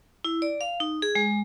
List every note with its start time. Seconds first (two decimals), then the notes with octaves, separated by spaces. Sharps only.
0.25 E4
0.42 D5
0.61 F5
0.80 D#4
1.02 G#4
1.15 G#3